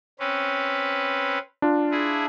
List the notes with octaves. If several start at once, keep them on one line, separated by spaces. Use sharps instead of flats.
C4 C#4 B4
D4 F4
E4 G#4